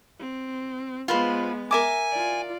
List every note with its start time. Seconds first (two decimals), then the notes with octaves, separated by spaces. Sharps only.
0.19 C4
1.08 G#3 B3 F4 B4 C5
1.71 A#4 E5 G#5 D6
2.12 F4 D5